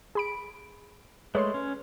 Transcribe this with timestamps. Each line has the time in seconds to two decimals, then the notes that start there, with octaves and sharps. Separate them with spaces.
0.15 G#4 B5 D7
1.35 G#3 A3 B4 C#5 C6
1.54 C#4